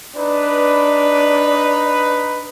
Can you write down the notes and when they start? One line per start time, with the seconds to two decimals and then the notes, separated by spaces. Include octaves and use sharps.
0.17 D4 D#4 B4